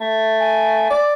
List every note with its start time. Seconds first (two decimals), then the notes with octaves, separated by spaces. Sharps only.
0.01 A3
0.40 G#5
0.90 D5